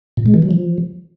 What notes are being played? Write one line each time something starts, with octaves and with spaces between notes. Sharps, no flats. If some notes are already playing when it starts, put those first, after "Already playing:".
A#2
G#3
E3
F#3
F3